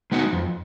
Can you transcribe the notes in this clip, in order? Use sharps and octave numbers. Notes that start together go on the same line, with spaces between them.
G#3 B3 D#4 F#4
F2